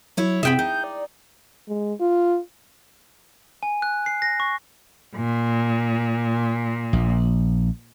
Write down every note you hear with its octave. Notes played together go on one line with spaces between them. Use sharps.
F#3 E4 C#5 E5
C3 B3 C4 G#4 E5 G5 B5
D#4 G6
D5
G#3
F4
G#5
F#6
C7
A#6
C#6
A#2
A#1